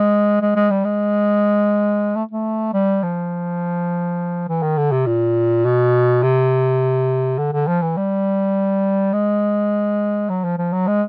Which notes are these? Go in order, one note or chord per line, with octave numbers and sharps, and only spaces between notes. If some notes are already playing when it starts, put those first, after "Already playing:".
Already playing: G#3
G#3
G#3
G3
G#3
A3
A3
G3
F3
E3
D#3
D3
C3
A#2
B2
C3
D3
D3
F3
E3
G3
G#3
F#3
F3
F3
F#3
G#3